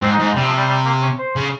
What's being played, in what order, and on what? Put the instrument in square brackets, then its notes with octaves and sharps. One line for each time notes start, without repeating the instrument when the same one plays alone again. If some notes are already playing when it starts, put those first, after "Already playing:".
[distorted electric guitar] G#2 [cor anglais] C4
[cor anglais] D#4
[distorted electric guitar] G#2
[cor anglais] D#4
[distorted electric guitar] C3 [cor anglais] G3
[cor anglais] F3
G3
G3
A#3
C#4
C5
[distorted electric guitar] C#3